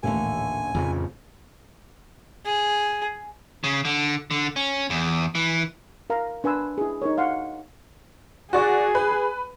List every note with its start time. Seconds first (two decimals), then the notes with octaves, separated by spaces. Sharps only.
0.03 D#1 A1 D#2 D3 A3 A#3 G#5
0.74 F2 C#3 F3
2.46 G#4
3.64 C#3
3.85 D3
4.31 D3
4.56 C#4
4.90 E2
5.35 E3
6.10 A#4 F5 A#5
6.44 D4 B4 G#5 C6 E6
6.78 E4 G#4
7.02 D#4 G4 A#4 C#5
7.18 F5 F#5 C6
8.53 F#4 G#4 D5 C#6
8.95 B4